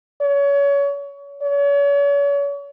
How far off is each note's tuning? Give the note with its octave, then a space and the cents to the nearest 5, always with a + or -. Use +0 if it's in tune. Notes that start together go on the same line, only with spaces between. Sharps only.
C#5 +30
C#5 +40